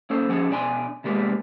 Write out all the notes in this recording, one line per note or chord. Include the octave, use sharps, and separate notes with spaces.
A#3 C#4 A4 C5
F3 C#4 G#4 F#5
B2 D4 D5 G#5 B5 C6
C3 G3 G#3 A#3 B3